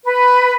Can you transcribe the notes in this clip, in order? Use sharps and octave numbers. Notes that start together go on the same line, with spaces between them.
B4